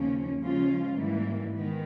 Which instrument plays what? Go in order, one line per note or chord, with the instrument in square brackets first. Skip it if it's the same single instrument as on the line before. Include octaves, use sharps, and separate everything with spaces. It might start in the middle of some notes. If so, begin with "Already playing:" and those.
Already playing: [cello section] D#2 C#3 F3 A#3 C#4
C#3 F3 G#3 C#4 F4
G#2 E3 G3 A#3
D#3 G#3 B3